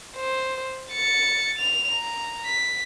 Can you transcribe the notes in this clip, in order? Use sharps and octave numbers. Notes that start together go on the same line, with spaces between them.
C5
A6 C#7
F7
A#5
B6